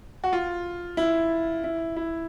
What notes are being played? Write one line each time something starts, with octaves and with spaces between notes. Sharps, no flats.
F#4
F4
E4
E4
E4